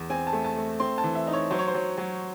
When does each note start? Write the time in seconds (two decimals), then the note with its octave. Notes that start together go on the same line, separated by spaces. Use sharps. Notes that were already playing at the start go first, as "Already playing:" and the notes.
Already playing: E2
0.10 C4 G#5
0.27 A5
0.33 A3
0.44 A5
0.56 A3
0.80 C4 C6
0.98 A5
1.04 E3
1.15 E5
1.27 D#4
1.33 C#5
1.51 F#3 C5
1.59 C#5
1.68 C5
1.74 F#3
1.98 F#3